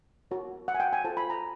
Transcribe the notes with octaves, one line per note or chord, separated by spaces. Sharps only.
F#4 A#4 C#5
F#5
G#5
G5
G#5
F4 A4 C5 A5
B5
A#5